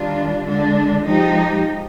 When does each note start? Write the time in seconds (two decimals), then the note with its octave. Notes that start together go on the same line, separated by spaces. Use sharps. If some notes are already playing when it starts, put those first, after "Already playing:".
Already playing: D#3 G3 D4 F4
0.43 D3 G#3 D4
1.04 F3 G#3 D#4 G4